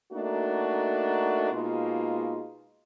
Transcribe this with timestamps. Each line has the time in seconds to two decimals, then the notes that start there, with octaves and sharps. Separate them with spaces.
0.12 A3 A#3 D4 D#4 F#4
1.52 B2 G#3 A#3 D#4 F4